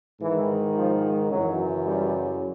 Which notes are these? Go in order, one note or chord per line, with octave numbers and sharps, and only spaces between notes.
G#2 D#3 E3
F3
F#2 C#3 E3 F#3
G3